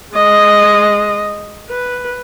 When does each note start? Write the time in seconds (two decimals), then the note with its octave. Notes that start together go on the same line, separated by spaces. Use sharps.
0.15 G#3 D#5
1.70 B4